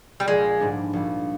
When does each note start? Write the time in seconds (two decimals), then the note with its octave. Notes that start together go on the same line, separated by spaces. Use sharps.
0.20 G3
0.28 A#1 G#3
0.60 G#2 G3 D4
0.93 A#1